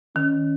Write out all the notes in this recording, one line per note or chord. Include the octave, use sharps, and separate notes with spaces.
D#3 C#4